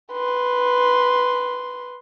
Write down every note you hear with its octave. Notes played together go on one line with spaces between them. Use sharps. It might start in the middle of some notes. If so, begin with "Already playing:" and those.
B4 C6